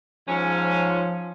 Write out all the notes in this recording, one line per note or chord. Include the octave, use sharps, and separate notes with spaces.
G#2 F3 C#4